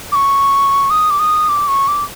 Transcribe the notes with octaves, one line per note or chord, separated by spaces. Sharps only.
D6
C#6
D#6
D6
D#6
D6
C#6
D6